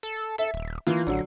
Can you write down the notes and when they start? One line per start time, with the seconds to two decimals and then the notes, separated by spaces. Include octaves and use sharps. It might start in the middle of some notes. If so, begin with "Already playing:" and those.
0.03 A4
0.38 A4 E5
0.54 D#1
0.87 E3 A#3 F4
1.07 A1 D3 F#3